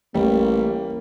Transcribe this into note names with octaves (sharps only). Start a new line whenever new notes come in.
A1 G3 A#3